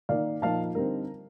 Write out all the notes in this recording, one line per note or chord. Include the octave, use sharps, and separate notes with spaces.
D#3 A#3 D#4 D5 F5
A#2 F3 A#3 D#4 F5 A5
D3 G3 C4 D#4 A#4